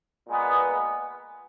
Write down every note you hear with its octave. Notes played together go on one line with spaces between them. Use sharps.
A#2 G#3 B3